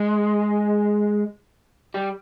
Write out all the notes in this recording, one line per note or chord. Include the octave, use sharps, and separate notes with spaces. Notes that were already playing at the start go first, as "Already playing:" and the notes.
Already playing: G#3
G3